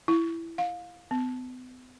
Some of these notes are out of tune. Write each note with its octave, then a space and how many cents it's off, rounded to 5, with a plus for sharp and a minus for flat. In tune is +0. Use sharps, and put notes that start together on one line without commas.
E4 +10
F5 +25
B3 +45